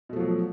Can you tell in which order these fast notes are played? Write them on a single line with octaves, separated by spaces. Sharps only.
B2 A3 F3 F#3